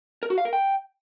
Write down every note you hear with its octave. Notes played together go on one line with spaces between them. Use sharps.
A#4
F#4
F5
A#4
G5